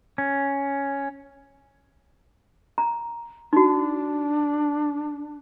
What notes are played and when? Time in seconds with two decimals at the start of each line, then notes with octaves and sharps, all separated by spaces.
0.18 C#4
2.78 A#5
3.53 D4 D#4 F#4